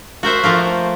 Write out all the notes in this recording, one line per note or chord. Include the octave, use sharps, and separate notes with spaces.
F#4 A#4 C5 E5
F3 A3 A#3